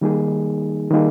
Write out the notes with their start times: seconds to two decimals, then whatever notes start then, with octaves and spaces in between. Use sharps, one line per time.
0.01 D#3 G3 A#3 D#4 G#4
0.91 D#3 G3 A#3 D#4 G#4